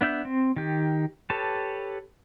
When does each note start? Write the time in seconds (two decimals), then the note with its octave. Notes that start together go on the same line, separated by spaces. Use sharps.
0.01 B3 D4 E5 G6
0.25 C4
0.56 D#3 G4
1.30 G4 A4 B4 C#5 A5